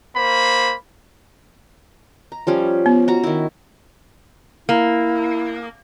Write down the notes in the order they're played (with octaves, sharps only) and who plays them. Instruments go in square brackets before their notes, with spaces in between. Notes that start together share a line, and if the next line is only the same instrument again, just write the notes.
[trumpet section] A#3 C5 B5
[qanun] A#5
F3 G3 C#4
[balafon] B3
[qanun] F#4 A#5
D#3 E4
[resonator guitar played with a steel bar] A#3 [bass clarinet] E4